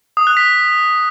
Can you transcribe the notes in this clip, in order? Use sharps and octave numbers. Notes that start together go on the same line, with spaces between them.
D#6
F#6
B6